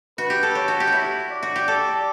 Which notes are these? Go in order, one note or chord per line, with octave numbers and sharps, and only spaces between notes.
F#4 B4
G4
A4
G4 C#5
F#4
G4
F#4
E4
D5
F#4
G4
A4 D5